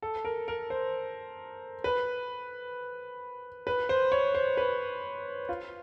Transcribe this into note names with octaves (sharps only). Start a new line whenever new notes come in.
A4
A#4
A#4
C5
B4
B4
C5
C#5
C5
B4
F4